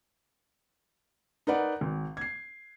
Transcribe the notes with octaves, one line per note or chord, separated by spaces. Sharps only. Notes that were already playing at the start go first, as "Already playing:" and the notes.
D#4 A#4 B4 D5 F#5
G#1
G#6 C7